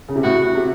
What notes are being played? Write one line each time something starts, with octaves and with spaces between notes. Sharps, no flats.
C#3
C3
A2 F#4
C3